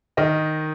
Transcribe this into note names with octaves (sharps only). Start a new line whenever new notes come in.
D#3 D#5